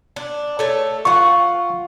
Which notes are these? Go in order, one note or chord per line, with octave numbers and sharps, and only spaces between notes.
D4
A3 A4 C#5
F4 F#5 C#6